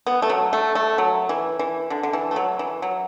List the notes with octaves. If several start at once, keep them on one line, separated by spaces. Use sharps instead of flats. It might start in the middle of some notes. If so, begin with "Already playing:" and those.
B3
A3
F#3
A3
A3
F#3
E3
E3
D3
D3
E3
A3
F#3
E3
F#3